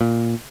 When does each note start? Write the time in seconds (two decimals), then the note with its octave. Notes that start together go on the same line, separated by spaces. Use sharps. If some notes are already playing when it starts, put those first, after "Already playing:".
0.01 A#2